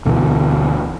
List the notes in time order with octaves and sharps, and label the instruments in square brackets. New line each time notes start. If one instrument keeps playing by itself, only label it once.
[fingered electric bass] D2 B2 D3 E3